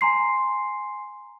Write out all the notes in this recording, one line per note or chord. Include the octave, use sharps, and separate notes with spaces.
G#5 A#5 C6 C7